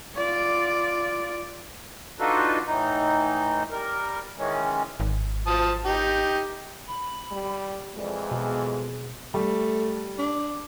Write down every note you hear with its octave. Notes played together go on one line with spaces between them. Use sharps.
F4 D5
D4 D#4 F4 F#4 A4 B4
A2 E3 D#4
G3 A#4
D#3 E3 G#3 C#4
G#1
F3 A5 D#6
D#4 G4
B5
G3
F2 E3 G#3 D5
B2 G#4
G3 A3
D4